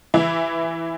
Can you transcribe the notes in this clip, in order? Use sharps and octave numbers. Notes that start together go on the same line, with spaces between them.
E3 E4